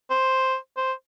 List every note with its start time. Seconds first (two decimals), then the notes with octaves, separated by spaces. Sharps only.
0.11 C5
0.77 C5